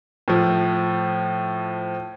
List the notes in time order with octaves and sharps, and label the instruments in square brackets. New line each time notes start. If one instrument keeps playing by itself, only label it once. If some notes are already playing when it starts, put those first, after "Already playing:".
[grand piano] A2 F3